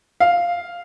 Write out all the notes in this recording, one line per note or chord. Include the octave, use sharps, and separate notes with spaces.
F5